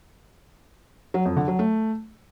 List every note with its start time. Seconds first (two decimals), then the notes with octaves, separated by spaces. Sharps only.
1.14 F#3
1.25 F2
1.37 D3
1.48 F#3
1.59 A3